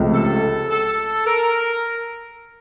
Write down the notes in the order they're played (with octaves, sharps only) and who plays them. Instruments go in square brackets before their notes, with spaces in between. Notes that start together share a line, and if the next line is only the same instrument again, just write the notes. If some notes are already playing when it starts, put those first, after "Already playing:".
Already playing: [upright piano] C#2 C3 F3 A3
[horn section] A4
A4
A#4